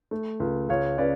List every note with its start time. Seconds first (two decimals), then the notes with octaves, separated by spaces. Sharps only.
0.11 A3
0.40 C#2
0.69 C#2 C#5 F5
0.98 C#3 B4 D5